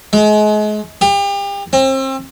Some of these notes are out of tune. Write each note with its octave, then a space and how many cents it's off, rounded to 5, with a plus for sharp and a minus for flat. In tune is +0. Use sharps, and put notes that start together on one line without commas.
G#3 +35
G4 +35
C4 +35